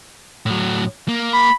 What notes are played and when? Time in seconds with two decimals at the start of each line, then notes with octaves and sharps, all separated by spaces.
0.46 A2 F#3
1.09 A#3
1.33 B5